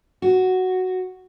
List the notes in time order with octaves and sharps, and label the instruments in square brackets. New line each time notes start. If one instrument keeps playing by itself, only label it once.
[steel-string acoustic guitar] F#4